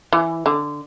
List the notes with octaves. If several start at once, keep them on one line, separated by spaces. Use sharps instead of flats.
E3
D3